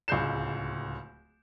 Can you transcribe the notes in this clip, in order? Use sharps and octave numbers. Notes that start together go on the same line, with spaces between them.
D1 C#2 G#3 G6 C7 E7